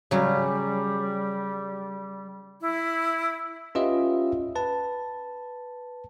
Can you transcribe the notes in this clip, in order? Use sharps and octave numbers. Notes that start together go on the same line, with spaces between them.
C#3 F#3 G3
E4
C#4 F4 G4 B4 D#5 E5
B4 A5